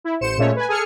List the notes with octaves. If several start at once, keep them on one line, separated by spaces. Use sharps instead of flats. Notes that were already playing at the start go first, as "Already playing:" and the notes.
E4
A1 C5 C#7 E7
A#2 G#3 A3 C#4 C#5
B4 G#5
G#4 A4 G#5 F6 C#7